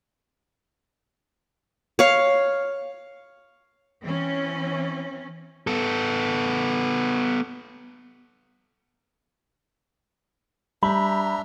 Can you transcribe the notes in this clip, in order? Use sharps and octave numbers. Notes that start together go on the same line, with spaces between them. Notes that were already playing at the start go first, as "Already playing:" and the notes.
C#5 F5
E3 C4 C#4
B3 A4
G3 D4 E5 A#5 B5